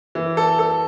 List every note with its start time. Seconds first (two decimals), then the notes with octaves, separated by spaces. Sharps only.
0.15 E3
0.37 A4
0.59 A4